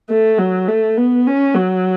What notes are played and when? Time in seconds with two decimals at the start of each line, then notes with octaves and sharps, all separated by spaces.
0.10 A3
0.38 F#3
0.68 A3
0.98 B3
1.27 C#4
1.55 F#3